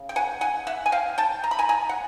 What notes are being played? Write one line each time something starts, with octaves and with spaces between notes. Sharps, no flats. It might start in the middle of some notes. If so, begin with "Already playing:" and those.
Already playing: C#3
G5
F#5 G#5
F#5 G#5
E5 F#5
G#5
F5 G5
G5 A5
A#5
B5
G#5 A#5
G#5 A#5
F#5